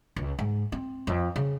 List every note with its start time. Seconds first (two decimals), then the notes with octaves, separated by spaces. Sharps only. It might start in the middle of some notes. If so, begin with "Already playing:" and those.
0.16 C#2
0.39 G#2
0.72 C4
1.07 F2
1.36 C#3